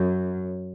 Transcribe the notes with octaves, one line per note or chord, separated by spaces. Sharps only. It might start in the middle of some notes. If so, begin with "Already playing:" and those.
Already playing: F#2